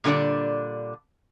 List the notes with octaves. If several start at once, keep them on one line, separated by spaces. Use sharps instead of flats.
A#2 D3 G3 D4 D5